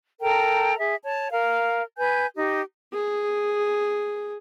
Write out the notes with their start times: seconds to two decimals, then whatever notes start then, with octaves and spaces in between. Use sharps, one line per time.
0.20 A4 A#4 G5 A#5
0.79 G#4 E5
1.04 C#5 A5
1.31 A#4 F5
1.97 B4 G#5 G6
2.36 D#4 G4
2.93 G#4